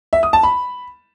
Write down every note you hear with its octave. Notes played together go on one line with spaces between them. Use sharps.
E5
D#6
A5
B5